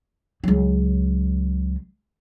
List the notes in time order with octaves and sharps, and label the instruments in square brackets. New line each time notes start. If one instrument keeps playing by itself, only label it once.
[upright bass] C#2 F#3